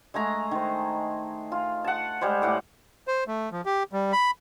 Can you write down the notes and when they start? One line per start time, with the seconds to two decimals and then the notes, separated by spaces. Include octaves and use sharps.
0.14 G#3 A3 G#5 A#5
0.51 D#3 C5
1.52 F4
1.84 F#5 A5
2.21 G3 G#3 C5
2.42 A2 F#5 D6
3.08 C5
3.28 A3
3.52 F3
3.66 G4
3.93 G3
4.12 B5